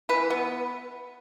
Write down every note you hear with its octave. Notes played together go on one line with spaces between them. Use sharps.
E3 B4
B3